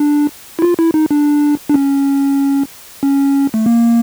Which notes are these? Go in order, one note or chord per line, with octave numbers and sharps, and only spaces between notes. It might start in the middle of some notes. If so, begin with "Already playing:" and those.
Already playing: D4
E4
F4
E4
D#4
D4
D4
C#4
C#4
A3
A#3